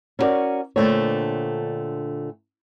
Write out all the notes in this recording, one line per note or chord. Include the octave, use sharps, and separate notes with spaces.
C#4 E4 F#4 A#4 D5
A#2 D3 A3 C4 D4 C#5